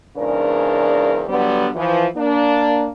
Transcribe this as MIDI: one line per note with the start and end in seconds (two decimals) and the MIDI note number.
0.17 1.23 40
0.17 1.23 44
0.17 1.23 49
0.17 1.23 62
0.17 1.23 70
0.17 1.23 74
1.29 1.69 50
1.29 1.69 54
1.29 1.69 55
1.29 1.69 59
1.76 2.07 52
1.76 2.07 53
2.16 2.88 58
2.16 2.88 62